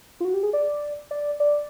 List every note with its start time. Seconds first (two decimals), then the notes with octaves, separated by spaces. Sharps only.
0.20 F4
0.25 F#4
0.34 G4
0.43 G#4
0.53 D5
1.11 D5
1.40 D5